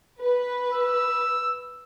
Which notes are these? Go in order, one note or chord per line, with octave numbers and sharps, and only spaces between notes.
B4
E6